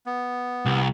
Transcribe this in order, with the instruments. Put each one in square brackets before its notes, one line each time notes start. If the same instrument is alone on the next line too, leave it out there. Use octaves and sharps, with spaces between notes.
[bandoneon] B3
[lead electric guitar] C2